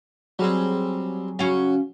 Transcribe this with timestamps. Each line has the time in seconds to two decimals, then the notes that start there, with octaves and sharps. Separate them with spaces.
0.39 F#3 G3 C4 G#4
1.39 C#3 F#3 C#4 F5